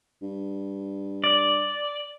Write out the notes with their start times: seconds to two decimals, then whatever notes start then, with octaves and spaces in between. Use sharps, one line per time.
0.22 G2
1.24 D5